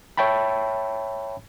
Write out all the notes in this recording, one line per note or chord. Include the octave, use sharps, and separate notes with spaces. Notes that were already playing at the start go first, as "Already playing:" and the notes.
C#5 E5 G5 A5 B5